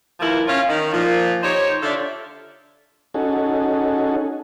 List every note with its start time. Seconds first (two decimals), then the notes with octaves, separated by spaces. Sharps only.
0.20 D#2 E3 F3 E4 A#4
0.47 C#4 F4
0.68 D#3
0.93 A#2 F3
1.43 D#4 G4 C5 C#5
1.83 D3 F4 A4 D5 E5
3.14 C#4 D#4 F#4 G#4 A4